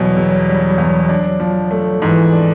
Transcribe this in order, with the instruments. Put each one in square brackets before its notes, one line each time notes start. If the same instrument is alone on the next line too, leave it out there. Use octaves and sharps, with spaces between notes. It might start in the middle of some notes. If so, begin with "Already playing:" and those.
Already playing: [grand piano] E2 B2 G3 [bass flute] F#3
[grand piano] E1
G3
E2
D4
F3
A3
[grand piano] G#2 [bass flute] E3
[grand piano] D4